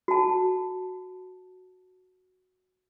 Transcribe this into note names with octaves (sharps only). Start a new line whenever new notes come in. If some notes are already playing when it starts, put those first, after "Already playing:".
F#4 A5